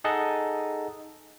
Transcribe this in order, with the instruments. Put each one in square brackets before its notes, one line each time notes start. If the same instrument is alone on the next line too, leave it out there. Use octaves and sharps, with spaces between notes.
[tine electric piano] D#4 G#4 A4 D#5 F#5 A5